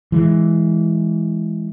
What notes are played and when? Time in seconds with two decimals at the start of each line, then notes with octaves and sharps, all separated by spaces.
0.12 E3 G#3